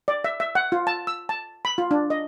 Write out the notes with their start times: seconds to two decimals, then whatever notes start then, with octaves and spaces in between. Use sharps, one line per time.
0.08 D5
0.24 E5
0.40 E5
0.55 F#5
0.72 F4
0.87 A5
1.07 E6
1.29 A5
1.65 B5
1.78 F4
1.91 D4
2.10 D#5